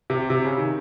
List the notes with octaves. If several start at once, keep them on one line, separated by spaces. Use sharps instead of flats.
C3
C3
C#3
D#3